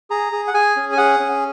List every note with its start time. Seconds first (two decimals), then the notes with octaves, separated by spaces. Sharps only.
0.10 G#4 A#5
0.32 G#4
0.48 F#5
0.54 G#4 G#5
0.76 C#4
0.92 G#5
0.97 G#4 F#5
1.19 C#4